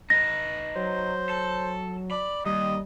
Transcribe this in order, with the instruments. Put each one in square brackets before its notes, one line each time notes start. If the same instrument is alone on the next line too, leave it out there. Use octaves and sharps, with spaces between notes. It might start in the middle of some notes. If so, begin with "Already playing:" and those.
[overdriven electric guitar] D#4 B4 [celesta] A#6
[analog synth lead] F#3 [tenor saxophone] C5
[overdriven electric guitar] A4
[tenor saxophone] D5 [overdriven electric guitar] B5
[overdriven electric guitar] D#2 [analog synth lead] G3 [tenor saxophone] D#5